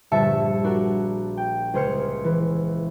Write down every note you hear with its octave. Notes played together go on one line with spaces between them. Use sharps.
A#1 G2 D3 E5 A5 C#7
D4 F#4 A#4
G5
C#2 G#4 C5 F6 C#7
E3